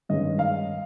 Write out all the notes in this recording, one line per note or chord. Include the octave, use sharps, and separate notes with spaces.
G2 D#3 G#3 C#4 D#5
F5